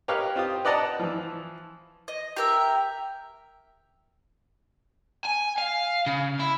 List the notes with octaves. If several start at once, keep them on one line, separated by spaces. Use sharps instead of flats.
G4 A#4 B4 C#5 D#5 F5
C4 F4 G4 D#6
B4 D5 D#5 F#5 A5 A#5
E3 F3
D#5
G4 A#4 E5
G#5
F5
C#3
E4